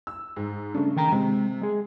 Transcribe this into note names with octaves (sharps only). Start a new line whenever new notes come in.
E6
G#2
C#3 A3 D4
D#3 G5 A#5
C3 G#3
G#3 G#4